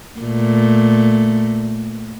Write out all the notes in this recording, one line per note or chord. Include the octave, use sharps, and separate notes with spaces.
A#2 A3